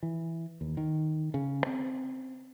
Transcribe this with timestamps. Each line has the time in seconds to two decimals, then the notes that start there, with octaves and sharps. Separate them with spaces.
0.03 E3
0.61 D#2
0.77 D#3
1.34 C#3
1.66 C4